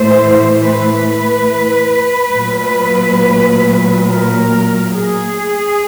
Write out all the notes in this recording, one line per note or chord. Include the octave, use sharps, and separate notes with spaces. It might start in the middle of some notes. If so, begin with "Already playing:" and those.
Already playing: A2 E3 A3 C5
B4
A#2 F#3 A3
A#4
G#4